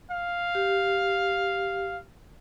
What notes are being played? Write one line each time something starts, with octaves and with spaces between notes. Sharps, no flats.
F5
G4